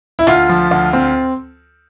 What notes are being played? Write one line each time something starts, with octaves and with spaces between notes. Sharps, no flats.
E4
D2 F4
F3
D2
C4